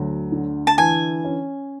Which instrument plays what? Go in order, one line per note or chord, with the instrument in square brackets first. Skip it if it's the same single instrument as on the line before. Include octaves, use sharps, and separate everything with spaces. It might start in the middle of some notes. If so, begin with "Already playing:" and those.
Already playing: [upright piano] D2 F#3
D3
[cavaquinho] A5
[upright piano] E3 [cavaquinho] G#5
[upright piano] C#4